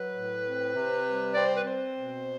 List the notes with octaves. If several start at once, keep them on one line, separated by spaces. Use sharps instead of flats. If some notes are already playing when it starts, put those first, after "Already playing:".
Already playing: F#3 B4
A2
C4
C3
G3
C4 D5
C5
B4
C4 C5
B2